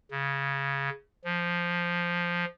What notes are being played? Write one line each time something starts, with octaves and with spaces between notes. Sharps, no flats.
C#3
F3